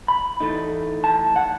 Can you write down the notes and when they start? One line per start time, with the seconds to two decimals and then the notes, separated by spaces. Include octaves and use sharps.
0.08 B5
0.40 A2 E3 A3 D#4
1.04 A5
1.36 F#5